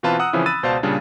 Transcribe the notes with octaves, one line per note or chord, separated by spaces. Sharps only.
B2 E3 C4 F4 B4 A5
F#5 A#5 D#6 E6 F#6
C#3 E3 F3 C4 C#4 E4
B5 E6 F#6 A6 D#7
C#2 B2 C5 D5 F5 A5
A#2 C#3 G3 D4